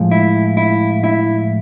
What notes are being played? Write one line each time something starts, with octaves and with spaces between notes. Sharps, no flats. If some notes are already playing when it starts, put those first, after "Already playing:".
Already playing: A2 F3 G#3
E4
E4
E4